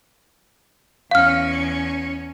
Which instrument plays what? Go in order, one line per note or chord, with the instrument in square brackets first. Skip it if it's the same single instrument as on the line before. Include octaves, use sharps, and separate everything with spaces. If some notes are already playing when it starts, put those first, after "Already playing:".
[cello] E2 C#4 [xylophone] F5 F6